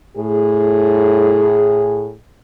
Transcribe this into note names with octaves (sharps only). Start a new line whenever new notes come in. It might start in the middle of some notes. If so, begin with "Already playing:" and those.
A2 G#4